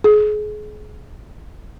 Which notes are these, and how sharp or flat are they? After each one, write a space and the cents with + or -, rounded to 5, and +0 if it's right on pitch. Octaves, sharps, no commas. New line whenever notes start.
G#4 +30